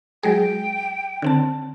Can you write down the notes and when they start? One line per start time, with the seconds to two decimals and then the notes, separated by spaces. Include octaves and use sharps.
0.23 F#3 G#3 G#4 G5
1.22 D3 C4 A5